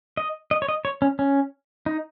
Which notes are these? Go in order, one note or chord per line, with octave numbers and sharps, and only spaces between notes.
D#5
D#5
C#5
D#5
C#5
C#4
C#4
D#4